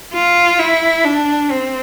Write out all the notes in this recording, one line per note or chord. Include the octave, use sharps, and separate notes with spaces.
F4
E4
D4
C4